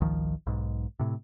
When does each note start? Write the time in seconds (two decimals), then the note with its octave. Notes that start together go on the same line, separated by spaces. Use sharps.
0.01 G#1 C#2 D#3 F3
0.47 B1 G#2
1.00 A2 C3